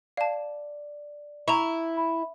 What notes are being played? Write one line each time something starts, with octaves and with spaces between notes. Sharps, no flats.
D5 F5 A5
E4 A#5 C#6
B5